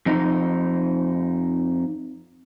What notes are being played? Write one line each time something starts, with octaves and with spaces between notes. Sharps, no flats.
F2 D#4